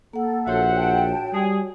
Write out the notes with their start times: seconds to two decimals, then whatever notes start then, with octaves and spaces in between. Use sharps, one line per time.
0.13 A#3 A4 F#5
0.47 A#1 F#4 C5 C#5 E5 F#5
0.77 G5 A5
1.33 G3 G#4